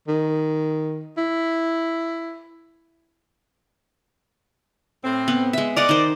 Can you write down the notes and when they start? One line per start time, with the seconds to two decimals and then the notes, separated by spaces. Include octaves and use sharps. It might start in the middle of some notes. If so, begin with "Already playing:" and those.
0.08 D#3
1.17 E4
5.04 A2 C4
5.28 B3
5.53 G#3 E5
5.77 A#4 D5 D#5 F#5
5.89 D#3 C5